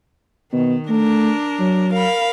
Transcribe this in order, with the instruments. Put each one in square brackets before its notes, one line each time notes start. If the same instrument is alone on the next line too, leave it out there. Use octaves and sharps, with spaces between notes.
[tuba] B2 [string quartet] D#3
[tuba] A3 [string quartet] D4 A#4
[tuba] F#3
[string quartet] A#4 F5 B5